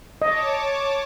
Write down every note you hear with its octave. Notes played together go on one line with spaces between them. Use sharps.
C#5 D#5 A5 D6